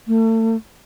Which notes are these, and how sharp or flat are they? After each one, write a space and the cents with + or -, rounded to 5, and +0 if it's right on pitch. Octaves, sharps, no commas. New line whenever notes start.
A3 +35